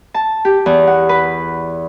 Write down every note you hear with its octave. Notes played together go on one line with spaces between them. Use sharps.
A5
G4
E2
F#5
B4